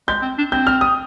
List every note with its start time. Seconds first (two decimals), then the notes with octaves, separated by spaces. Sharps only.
0.08 G#3 G6
0.22 C4
0.38 D4
0.52 C4 G6
0.67 F6
0.81 D#6